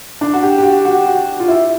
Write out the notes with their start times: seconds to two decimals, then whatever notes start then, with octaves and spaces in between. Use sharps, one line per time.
0.21 D4
0.34 F#4
0.43 G4
0.58 G4
0.63 F#4
0.85 F#4
1.06 F#4
1.40 F4
1.48 E4